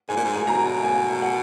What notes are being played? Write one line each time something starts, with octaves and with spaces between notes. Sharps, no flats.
G#2 G#5
A#2
G#2
G#5
B2 A#5
G#5
F#5